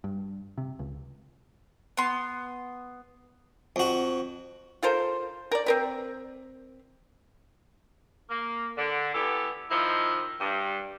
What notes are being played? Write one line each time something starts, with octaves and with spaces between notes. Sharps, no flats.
G2
C3
C#2
B3 C6
F2 F#4
F4 A4 A#4 C5
A#4 D5
C4 A#4 B4
A#3
D3
E3 B3 G4 A4
D#3 F3 D#4 E4
G2